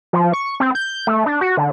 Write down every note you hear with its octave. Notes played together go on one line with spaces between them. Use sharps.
F3
C#6
C4
G6
A3
D4
F#4
D3